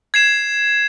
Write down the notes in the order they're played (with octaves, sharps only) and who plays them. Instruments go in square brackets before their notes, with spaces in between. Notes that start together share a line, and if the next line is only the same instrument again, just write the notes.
[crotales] G#6 C7 E7